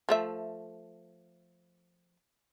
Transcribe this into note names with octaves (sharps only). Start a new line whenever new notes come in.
F3 A3 E5